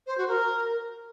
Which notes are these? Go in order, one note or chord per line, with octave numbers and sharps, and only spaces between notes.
C5
F#4
A#4